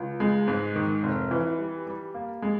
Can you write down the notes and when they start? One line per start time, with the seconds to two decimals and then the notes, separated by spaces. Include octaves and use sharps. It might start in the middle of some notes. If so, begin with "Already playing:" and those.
Already playing: C#2
0.20 G#3
0.48 G#2
0.76 D#3
1.03 F1
1.31 E3
1.58 G3
1.87 G3
2.14 A#3
2.42 G#3